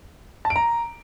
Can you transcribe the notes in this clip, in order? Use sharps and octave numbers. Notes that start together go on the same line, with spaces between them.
A5
D7
A#5